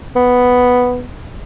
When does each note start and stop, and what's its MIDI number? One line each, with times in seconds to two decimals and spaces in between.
0.16 1.04 59